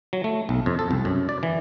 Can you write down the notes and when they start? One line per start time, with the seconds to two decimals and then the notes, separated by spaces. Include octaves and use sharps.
0.13 F#3
0.24 A3
0.49 B1
0.66 F2
0.79 A4
0.91 C2
1.05 F#2
1.29 D5
1.43 E3